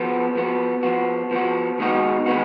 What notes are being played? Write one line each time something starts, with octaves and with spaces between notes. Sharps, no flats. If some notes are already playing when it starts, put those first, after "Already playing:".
Already playing: F3 B3 F#4
F3 B3 F#4
F3 B3 F#4
F3 B3 F#4
D#3 G#3 B3 D#4 F#4
D#3 G#3 B3 D#4 F#4